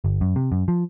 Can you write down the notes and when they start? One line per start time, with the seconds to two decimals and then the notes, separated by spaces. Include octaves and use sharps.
0.04 G1
0.21 F#2
0.36 C3
0.52 F#2
0.68 F3